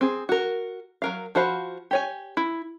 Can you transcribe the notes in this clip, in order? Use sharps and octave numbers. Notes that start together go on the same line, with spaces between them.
C4 G#4
F#4 A#4
F#3 A#4 F5
F3 F#4 C5 F5 B5
G4 C#5 G#5
E4